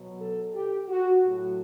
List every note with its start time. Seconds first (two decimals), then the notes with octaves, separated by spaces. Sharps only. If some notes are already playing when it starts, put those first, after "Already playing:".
Already playing: B2 F#3
0.21 A4
0.55 G4
0.88 F#4
1.23 A2 F#3 F#4